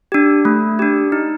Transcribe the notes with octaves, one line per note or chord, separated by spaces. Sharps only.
D4 G4
A3
D4 G4
D#4